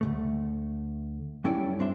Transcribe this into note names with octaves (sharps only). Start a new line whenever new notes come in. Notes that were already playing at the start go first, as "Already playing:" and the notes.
D2 G#2 A3
F#2 G3 C#4 E4 A4 D5
G2 C4 D4 E5 C6